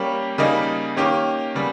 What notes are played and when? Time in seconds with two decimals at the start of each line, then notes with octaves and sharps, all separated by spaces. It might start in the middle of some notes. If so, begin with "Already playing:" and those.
Already playing: G3 A#3 C#4 G4
0.38 C#3 G3 A#3 D#4
0.96 D#3 A#3 C#4 G4
1.55 C#3 G3 B3